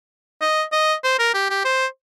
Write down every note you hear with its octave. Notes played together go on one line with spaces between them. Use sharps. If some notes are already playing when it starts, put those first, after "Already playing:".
D#5
D#5
C5
A#4
G4
G4
C5